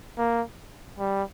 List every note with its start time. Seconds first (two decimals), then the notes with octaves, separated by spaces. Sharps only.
0.17 A#3
0.98 G3